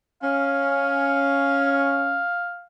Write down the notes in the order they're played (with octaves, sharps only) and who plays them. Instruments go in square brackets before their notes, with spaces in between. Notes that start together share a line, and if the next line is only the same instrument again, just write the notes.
[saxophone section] C#4 [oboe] F5